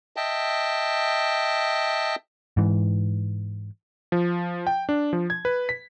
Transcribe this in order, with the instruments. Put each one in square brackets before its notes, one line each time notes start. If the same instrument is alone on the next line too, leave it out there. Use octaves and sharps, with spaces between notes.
[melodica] D#5 E5 G5 A5
[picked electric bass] G#2 E3
[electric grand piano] F3
G5
D4
F3
G#6
B4
B6